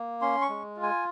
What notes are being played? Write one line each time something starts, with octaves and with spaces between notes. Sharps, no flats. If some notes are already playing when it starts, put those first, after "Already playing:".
Already playing: A#3
C#4 C6
C#6
G#3
F4
G#5